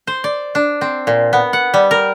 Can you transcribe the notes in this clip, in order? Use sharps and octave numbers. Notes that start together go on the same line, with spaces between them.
C5
D5
D4
C4
A#2
B3
F#5
G3
A#4